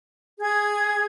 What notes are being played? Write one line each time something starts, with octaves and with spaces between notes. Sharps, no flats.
G#4 G#6